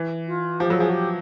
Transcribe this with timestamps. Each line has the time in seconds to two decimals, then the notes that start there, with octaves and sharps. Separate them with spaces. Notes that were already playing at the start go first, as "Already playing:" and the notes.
Already playing: E3
0.27 F4
0.60 F3 G4
0.70 F#3 A4
0.77 F3 G#4
0.89 F#4
0.93 G4